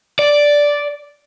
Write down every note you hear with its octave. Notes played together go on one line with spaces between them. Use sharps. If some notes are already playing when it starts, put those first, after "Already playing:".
D5